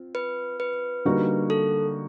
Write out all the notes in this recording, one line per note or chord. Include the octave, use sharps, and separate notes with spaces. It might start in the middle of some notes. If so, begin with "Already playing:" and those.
Already playing: C4 F4
B4
B4
D3 G3 A#3 D#4 F#4
A4